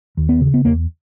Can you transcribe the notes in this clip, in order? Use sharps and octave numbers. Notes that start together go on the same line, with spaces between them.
D#2
B3
C#3
B3
E2 A#3